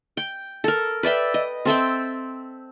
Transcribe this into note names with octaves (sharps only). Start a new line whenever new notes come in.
G5
A4 A#4
B4 D5 E5 G5
D#5
C4 A4 E5 G5